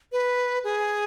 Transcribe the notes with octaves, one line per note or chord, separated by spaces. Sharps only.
B4
G#4